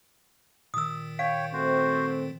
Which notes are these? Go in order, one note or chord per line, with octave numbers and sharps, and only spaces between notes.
A#2 D#3 D#6 E6
C#5 F5 G5
A3 C4 F#4 C5